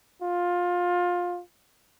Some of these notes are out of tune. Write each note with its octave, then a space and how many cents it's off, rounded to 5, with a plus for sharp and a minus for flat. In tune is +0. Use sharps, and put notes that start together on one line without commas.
F4 +20